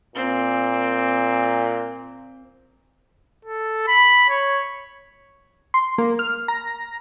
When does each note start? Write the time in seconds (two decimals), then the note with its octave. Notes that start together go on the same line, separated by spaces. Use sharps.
0.15 A#2 C4
3.45 A4
3.88 B5
4.30 C#5
5.74 C6
5.98 A#3
6.19 F6
6.48 A#5